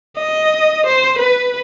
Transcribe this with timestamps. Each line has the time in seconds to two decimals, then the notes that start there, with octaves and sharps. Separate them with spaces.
0.18 D#5
0.86 C5
1.18 B4